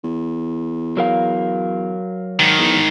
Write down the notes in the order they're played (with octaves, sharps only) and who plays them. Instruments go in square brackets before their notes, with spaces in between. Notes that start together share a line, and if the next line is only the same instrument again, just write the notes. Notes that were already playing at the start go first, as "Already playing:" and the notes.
[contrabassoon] E2
[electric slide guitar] F#3 A#4 F5
[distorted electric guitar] G#2 D#3
[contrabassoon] E2